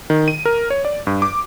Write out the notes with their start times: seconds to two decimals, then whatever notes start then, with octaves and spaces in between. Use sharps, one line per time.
0.10 D#3
0.28 D#7
0.45 A#4
0.70 C#5
0.85 D5
1.07 G2
1.22 D6